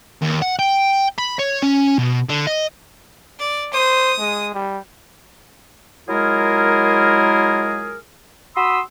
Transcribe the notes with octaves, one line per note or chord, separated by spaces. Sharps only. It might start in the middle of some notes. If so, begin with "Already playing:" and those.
D#2
F#5
G5
B5
C#5
C#4
B2
D3
D#5
D5
C5 D#6
G#3
G3
F#3 G#3 E4 F4 G#4 A#4
F#4 B5 C6 D#6 E6